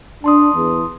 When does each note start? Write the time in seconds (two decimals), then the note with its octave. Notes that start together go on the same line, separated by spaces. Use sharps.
0.24 D4 A5 C6 D#6
0.54 E2